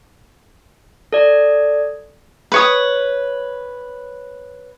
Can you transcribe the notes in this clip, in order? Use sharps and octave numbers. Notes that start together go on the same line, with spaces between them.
A4 D5
B4 C#5 D#6